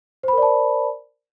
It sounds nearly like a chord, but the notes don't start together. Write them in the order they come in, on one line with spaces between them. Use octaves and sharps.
C5 B5 A#4 D5 A5